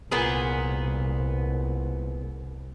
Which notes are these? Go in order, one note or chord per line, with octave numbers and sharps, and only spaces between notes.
C2 A#2 B3 G#4